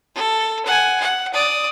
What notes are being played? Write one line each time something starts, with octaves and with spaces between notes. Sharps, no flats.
A4
F#5 G#5
F#5
D5 D#6